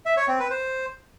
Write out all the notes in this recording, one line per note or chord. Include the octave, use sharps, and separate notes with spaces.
E5
C#5
C4
B4
C5